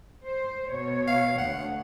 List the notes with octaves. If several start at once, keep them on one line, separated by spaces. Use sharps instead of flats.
C5
B2 C#5
F5
D2 F#5